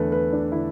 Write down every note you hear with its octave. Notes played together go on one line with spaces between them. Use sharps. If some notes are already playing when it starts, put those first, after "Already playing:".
Already playing: E2 D3 A3 A4 B4
B4
D4
D3 E4